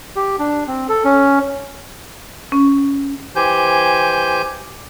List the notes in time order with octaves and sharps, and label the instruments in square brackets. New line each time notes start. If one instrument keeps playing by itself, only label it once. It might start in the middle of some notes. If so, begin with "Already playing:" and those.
[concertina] G4
D4
C4
A4
C#4
[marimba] C#4
[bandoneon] E3 G4 C5 G#5 G6